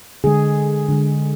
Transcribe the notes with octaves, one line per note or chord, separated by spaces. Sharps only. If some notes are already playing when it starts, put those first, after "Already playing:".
D3 G#3 G#4
D3 G#3